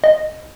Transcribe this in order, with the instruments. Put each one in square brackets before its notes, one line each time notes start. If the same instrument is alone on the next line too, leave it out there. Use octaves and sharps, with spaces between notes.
[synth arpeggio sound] D#5